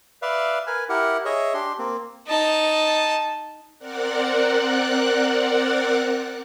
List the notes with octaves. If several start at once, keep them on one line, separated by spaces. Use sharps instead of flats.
B4 D5 E5 F5
A#4 B4 G#5
E4 G4 A#4 F#5
G#4 C#5 D#5 E5
D4 G4 C6
A#3 C4
D#4 A5
C4 A#4 D5 F#5 F#6